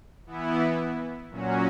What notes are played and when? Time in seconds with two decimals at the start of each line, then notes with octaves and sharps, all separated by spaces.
0.27 E3 B3 E4
1.30 A#2 F#3 C#4 F#4